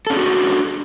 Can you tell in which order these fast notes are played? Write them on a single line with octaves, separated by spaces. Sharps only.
A4 C#4 G#4 F#4 D4